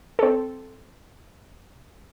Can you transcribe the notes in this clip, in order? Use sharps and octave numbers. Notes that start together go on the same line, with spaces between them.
C4 A4